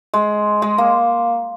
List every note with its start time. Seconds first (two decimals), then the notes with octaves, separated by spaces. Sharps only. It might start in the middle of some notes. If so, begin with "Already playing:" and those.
0.14 G#3
0.62 G#3
0.78 A#3